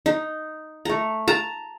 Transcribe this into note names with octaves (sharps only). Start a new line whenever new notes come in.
D#4
A3 A#5
A5 A#5